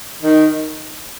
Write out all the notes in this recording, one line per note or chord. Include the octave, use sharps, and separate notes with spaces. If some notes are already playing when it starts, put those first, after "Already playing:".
D#3